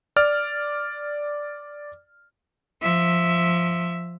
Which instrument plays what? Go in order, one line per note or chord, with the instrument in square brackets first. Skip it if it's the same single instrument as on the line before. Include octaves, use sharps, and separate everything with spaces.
[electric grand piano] D5 F6
[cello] F3 E5